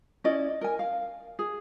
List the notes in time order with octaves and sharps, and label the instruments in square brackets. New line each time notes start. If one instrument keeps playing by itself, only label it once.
[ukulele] C#4 E4 D5 D#5
A#4 G#5
F5
G#4